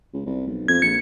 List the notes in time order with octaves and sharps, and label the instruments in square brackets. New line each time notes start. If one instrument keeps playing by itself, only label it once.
[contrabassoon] C#2
C2
B1
[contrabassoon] F2 [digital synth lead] G#6
[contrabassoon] A#1 [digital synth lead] C#7